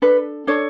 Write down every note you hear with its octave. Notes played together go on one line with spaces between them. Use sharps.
D4 A4 B4
D4 A4 C#5